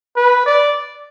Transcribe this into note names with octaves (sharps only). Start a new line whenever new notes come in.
B4
D5